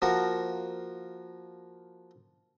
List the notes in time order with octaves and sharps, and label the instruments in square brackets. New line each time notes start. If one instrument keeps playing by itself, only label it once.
[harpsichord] F3 A#3 F#4 A#4